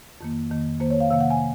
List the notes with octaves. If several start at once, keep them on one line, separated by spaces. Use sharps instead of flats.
F2 D#3 A#3
F2 D#3 A#3
F2 D#3 A#3 C5
C#5
F5
C3 D#3 A#3 F5
F#5
G#5